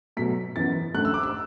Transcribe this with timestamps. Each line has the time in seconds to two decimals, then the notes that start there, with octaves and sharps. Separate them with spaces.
0.17 B2 F#3 A3 B6
0.56 F#2 E3 B3 A6
0.94 F#2 D3 A3 F#6
1.05 E6
1.14 D6
1.23 E6